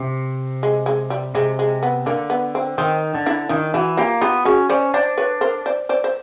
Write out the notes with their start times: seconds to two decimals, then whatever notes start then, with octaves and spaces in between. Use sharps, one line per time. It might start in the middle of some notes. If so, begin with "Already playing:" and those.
Already playing: C3
0.63 G#3
0.86 G#3
1.10 G3
1.35 C3 G#3
1.59 G#3
1.83 B3
2.06 D3 A#3
2.30 B3
2.55 C4
2.78 D#3 C4
3.15 D3
3.26 D4 E4
3.49 D#3 D4 E4
3.74 E3 E4 F#4
3.97 A#3 F4 G4
4.21 B3 F4 G4
4.45 C#4 F#4 G#4
4.69 C#4 C5 D5
4.94 D4 C5 D5
5.18 B4 C#5
5.41 A#4 C5
5.66 C5 D5
5.89 C5 D5
6.04 C5